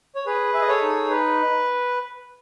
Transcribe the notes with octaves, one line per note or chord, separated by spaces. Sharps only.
C#5
G#4 B4
G#4 E5
D#5
A4 C#5
D#4
B4